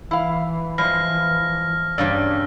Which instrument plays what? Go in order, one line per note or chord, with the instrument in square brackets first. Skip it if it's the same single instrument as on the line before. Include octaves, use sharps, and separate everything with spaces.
[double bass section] E3 [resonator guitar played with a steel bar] E4 F5
[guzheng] F3 G#3 [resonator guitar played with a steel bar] G3 [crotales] F6 A#6
[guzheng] G2 C#3 G3 [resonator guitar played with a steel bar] A#3 D5 [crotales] E6